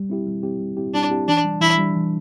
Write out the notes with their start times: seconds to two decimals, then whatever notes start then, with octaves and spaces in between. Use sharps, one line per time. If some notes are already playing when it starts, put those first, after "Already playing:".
Already playing: G3
0.10 C4 E4 G4
0.26 G3
0.43 C4 E4 G4
0.60 G3
0.77 C4 E4 G4
0.94 G3 D4
1.10 C4 E4 G4
1.28 E3 D4
1.44 G3 D4
1.61 E3 E4
1.78 G3 D4
1.95 E3